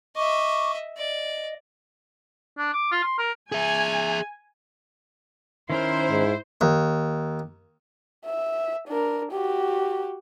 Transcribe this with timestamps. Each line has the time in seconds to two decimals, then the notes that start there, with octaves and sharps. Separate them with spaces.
0.16 D#5 E5 C#6 D6
0.98 D5 D#5
2.58 D4
2.73 D6
2.92 F4
3.04 C6
3.18 A#4
3.52 G#4 E5 G#5
5.70 D#3 C#4 E4 A#4 C5
6.10 G#2
6.61 D#2
8.25 E5
8.88 D4 A#4
9.32 F#4 G4